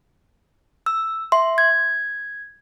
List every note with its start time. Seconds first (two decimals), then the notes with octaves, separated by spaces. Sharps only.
0.86 E6
1.32 E5 C6
1.58 G#6